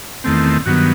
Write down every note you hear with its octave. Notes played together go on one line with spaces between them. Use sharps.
E2 D#3 A3 C4
G2 D#3 F#3 B3 F#4